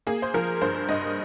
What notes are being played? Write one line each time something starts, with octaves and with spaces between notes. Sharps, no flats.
A#3 G#4
C5
F3 A#4
G2 C5
G2 D#5